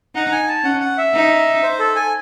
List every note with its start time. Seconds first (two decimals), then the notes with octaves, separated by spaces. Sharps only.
0.15 D#4 F#5
0.32 G#5
0.48 A5
0.64 C#4 F#5
0.80 F#5
0.98 E5
1.14 D#4
1.63 C5
1.79 A4
1.96 G#5